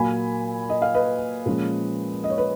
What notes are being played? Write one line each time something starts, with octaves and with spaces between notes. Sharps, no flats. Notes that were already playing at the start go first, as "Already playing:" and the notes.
Already playing: A#2 F#3 A#3 G#5 B5
D#5
F5
B4 D#5
A#2 F3 G#3 C#4
D#5
C#5
B4